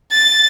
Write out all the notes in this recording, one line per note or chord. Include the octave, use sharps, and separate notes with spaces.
A6